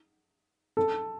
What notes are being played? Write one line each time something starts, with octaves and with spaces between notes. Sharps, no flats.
A4